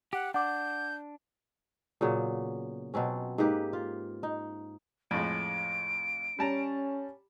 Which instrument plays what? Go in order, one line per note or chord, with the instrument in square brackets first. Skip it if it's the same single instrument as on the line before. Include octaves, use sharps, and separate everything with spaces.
[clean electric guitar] G4 [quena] F#5
[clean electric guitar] D4 [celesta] F#5 D6 [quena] G6
[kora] A#2 C#3 F#3 B3
B2 F#3 C4 C#4
G#2 A#3 G4 B4
F4
D#4
[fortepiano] F2 A2 G#3 [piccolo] D7
[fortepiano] G3 A5 A#5 [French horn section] C#4